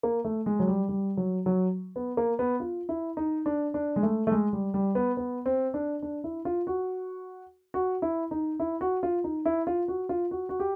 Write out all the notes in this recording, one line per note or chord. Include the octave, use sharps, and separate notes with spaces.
A#3
A3
G#3
F#3
G3
G3
F#3
F#3
B3
A#3
B3
F4
E4
D#4
D4
D4
G#3
A3
A3
G#3
G3
G3
B3
B3
C4
D4
D4
E4
F4
F#4
F#4
E4
D#4
E4
F#4
F4
D#4
E4
F4
F#4
F4
F#4
F#4
G4